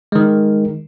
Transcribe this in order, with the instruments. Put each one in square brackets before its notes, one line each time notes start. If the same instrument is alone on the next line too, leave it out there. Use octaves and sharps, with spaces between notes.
[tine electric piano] D#3 G#3